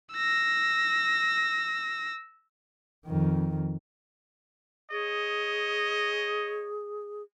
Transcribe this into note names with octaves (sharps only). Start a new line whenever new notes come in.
E6 A#6
F2 D#3
G#4 C#5 D#5